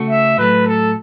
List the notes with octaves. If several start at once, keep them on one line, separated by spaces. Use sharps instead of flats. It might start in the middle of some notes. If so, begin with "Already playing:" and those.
Already playing: C#3 A3 F#4 A4
E5
A2 F#3 A3 B4
A4